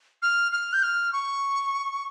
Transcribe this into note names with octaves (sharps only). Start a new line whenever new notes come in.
F6
F6
G6
F6
C#6